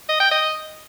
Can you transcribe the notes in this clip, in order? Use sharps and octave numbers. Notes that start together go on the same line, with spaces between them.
D#5
G5
D#5